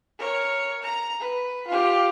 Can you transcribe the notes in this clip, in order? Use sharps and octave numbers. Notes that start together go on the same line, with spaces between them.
A#4 C#5
A#5
B4
F4 G4